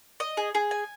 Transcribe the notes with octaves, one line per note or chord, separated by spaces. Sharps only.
D#5
G#4
G#4
G#5